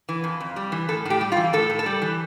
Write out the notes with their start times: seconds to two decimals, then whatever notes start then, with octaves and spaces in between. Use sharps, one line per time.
0.09 E3
0.24 F2
0.40 F2
0.56 G3
0.72 E3
0.89 A2 A4
1.05 A2 G4
1.21 G3
1.32 F4
1.37 E3
1.53 A2 A4
1.70 A2
1.79 A4
1.86 G3
2.02 E3